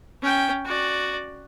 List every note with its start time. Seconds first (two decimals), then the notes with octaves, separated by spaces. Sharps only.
0.22 C#4 G5
0.65 F#4 D5